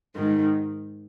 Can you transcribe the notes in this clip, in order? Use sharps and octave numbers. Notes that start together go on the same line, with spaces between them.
G#2 D#3